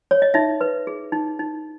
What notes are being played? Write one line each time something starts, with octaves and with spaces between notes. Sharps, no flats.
C#5
D#5
D#4 E5
B4
G#4
D#4
D#4